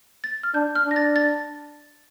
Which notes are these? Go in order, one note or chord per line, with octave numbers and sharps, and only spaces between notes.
A6
F6
D4 G6
F6
D4
A#6
A6
A6